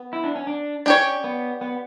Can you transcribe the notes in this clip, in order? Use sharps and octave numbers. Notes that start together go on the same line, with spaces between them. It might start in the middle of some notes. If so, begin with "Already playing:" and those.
Already playing: B3
E4
D4
C#4
D4
C#4 D4 G4 C#5
B3
B3